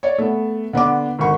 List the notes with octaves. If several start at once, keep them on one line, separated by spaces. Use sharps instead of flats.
C#5 D5
A3 B3
D3 B3 D4 D6
G#1 D3 C#6